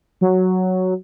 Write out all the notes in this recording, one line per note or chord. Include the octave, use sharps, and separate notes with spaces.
F#3